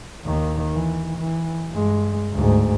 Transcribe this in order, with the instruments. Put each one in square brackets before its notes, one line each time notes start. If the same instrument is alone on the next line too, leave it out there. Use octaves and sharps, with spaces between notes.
[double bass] D#2 D#3
E3
E3
G2 G#3
D2 G#2